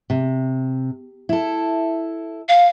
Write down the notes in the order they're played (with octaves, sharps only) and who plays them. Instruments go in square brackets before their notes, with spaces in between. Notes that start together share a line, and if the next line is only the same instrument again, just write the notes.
[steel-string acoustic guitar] C3
E4 A4
[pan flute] F5